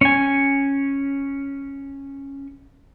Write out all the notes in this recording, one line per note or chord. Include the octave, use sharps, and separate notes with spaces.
C#4 G#5